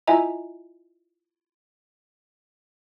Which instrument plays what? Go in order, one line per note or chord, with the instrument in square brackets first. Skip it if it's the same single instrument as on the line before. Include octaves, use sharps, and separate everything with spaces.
[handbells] E4 F4 D#5 E5 G#5 A#5